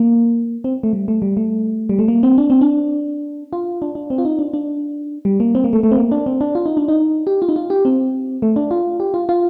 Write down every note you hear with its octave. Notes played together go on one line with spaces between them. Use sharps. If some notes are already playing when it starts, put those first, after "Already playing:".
Already playing: A#3
C4
A3
G3
A3
G3
A3
G3
A3
A#3
C4
D4
C4
D4
F4
D4
D4
C4
F4
D#4
D4
D4
G3
A#3
C4
A#3
A3
A3
C4
A#3
D4
C4
D4
F4
D#4
D4
D#4
G4
F4
D#4
F4
G4
C4
A3
D4
F4
G4
F4
F4